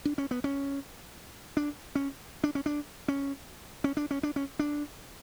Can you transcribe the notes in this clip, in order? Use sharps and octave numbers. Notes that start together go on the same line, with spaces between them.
D4
C#4
B3
C#4
D4
C#4
D4
C#4
D4
C#4
C#4
D4
C#4
D4
C#4
D4